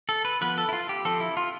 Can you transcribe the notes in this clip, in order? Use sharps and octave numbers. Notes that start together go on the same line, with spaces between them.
A4
B4
F3 B3 B4
A4
E4
F4
G4
F3 C4 A4
E4
F4